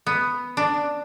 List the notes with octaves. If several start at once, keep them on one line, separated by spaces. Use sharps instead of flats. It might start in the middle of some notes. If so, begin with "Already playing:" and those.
B3
D4